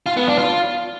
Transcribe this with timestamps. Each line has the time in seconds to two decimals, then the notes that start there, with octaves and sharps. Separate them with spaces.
0.06 F4
0.17 B3
0.28 D4
0.38 F4